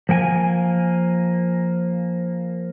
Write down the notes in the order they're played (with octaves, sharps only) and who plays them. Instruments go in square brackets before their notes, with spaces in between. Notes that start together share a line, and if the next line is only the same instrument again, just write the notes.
[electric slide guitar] F3 A#3 G5 G#5